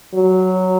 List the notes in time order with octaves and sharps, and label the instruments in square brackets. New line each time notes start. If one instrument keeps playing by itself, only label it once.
[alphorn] F#3